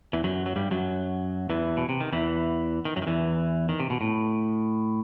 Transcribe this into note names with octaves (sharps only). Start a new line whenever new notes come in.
E2 E3
F#2 F#3
F#3
G2 G3
F#2 F#3
E2 E3
B2
C3
D#3
E2 E3
D#3
F#2 F#3
D#3
E2 E3
D#3
C3
B2
A2